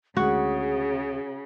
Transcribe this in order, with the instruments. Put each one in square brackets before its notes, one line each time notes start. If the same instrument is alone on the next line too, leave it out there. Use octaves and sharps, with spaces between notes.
[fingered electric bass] D2 G#3 [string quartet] C#3 [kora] F#4 [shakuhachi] G#4